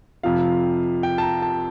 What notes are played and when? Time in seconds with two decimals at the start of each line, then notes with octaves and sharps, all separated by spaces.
0.23 F2 C3 F3 F5
1.03 G5
1.18 A5
1.22 A#5
1.42 A5